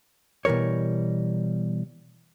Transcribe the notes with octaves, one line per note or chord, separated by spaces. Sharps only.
B2 E3 G3 A#4 C#5